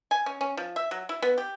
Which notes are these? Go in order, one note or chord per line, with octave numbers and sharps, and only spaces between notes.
G#5
C#4
C#4
F3
E5
F#3
E4
B3
G4